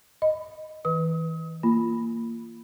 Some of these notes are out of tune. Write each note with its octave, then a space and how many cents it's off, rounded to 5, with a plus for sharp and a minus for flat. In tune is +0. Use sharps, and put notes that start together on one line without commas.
D#5 +0 B5 +20
E3 -25 B4 +0 D#6 +40
A#3 -15 F4 -20 B5 +0